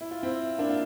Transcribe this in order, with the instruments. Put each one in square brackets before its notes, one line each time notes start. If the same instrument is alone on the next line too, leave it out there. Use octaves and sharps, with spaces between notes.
[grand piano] E4
F4
C4 E4
A#3 D4
F4